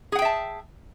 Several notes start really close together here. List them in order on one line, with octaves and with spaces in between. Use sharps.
G#4 F#5 G5 E5 A5